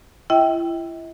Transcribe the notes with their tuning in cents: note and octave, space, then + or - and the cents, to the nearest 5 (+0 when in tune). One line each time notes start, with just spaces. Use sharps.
E4 +35 E5 -45 G5 +0